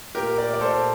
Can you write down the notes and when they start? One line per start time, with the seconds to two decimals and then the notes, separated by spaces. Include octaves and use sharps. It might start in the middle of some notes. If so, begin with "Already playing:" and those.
0.15 A#2 G4 A#4
0.38 A#4 D5
0.54 D5
0.61 A#2 A4 C5